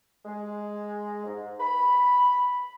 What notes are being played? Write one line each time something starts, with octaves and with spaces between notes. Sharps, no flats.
G#3
G#2
B5